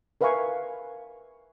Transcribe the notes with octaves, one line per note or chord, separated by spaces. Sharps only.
A#4 B4 E5 F5 G#5 C#6